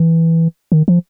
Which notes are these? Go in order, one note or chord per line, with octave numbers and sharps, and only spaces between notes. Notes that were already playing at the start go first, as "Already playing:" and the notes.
Already playing: E3
D#3
F3